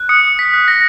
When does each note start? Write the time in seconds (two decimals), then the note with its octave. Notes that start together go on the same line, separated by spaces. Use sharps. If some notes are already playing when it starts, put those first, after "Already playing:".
Already playing: F#6
0.09 D#6 C#7
0.39 B6
0.54 F#6
0.68 A#6